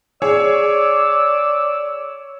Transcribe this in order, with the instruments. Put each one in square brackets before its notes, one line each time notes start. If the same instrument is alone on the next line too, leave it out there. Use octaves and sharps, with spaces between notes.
[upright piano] G#4 [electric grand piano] C#5 [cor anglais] D5 [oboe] E6